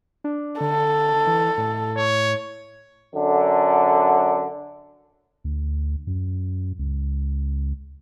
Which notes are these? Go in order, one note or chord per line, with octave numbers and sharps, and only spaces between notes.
D4
D3 A4
E3
A2
C#5
F#2 D3
D2
F#2
C#2